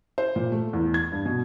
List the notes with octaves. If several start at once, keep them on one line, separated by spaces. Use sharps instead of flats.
C5
A#2
A3
E2
G#6
G2
B2